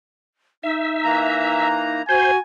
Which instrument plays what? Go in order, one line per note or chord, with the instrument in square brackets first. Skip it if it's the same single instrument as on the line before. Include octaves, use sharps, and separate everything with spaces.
[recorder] D#4 [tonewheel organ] E5
[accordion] E3 A#3 A#5
[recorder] F#4 [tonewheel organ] C5 [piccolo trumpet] G#5